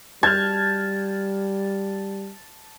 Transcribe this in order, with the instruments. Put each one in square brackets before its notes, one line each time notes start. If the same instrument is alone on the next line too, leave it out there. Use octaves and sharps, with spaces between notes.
[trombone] G3 [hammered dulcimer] A5 [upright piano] F6 G6 G#6